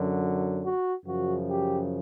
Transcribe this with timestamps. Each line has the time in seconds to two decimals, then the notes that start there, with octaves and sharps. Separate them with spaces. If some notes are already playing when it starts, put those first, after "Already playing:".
Already playing: F#2 D3 F#3
0.64 F#4
1.06 F#2 C#3 F3 F#4
1.48 G4